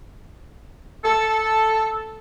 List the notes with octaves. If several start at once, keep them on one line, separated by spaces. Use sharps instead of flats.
A4